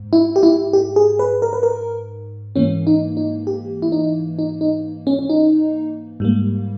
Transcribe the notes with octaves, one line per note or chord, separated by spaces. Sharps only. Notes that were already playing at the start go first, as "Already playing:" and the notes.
Already playing: G#2
E4
G4
E4
G4
G#4
B4
A#4
B4
A#4
G#2 E3 A#3 C#4
D#4
D#4
G4
E4
D#4
D#4
D#4
C#4
C#4
D#4
G#2 G3 A#3